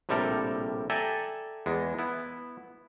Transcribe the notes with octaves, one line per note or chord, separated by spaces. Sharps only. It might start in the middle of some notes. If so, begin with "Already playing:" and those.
A#1 A2 C3 G3 A4 A#4
A4 D5 E5 G5 G#5 A#5
E2 G#3
B3 E4